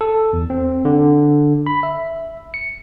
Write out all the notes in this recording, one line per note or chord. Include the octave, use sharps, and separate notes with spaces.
A4
E2
C4
D3
B5
E5
C#7